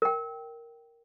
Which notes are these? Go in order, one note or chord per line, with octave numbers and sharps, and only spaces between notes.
A#4 G5